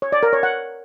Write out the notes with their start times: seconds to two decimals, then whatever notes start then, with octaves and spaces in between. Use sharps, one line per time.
0.02 C#5
0.12 D5
0.23 A#4
0.33 C#5
0.43 F#5